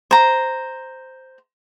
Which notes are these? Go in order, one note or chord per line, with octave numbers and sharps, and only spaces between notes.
C5 A#5